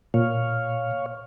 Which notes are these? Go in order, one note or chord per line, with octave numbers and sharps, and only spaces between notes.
A#2 C#5 F5